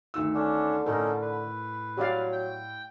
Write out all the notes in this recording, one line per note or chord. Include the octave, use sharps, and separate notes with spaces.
D2 D#3 E6
D3 C#4 D4
A2 C#4 D#4 A4 A#4
B4
F#3 G4 D5 F5
G5